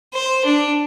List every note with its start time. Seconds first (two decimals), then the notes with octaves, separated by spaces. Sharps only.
0.14 C5
0.45 D4